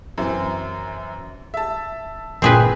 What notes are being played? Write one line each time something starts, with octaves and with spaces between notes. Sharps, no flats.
F#2 E3 C4
E5 A5
G1 A#2 C4 G#4 B4 G6